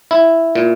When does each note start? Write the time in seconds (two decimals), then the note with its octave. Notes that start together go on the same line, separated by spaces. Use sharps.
0.11 E4
0.55 A#2